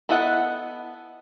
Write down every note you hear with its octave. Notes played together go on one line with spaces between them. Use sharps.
B3 E4 A4 D#5 F#5